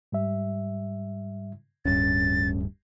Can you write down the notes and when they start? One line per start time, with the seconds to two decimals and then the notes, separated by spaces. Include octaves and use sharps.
0.12 G#2 G3 E5
1.85 D1 G2 C#4 A6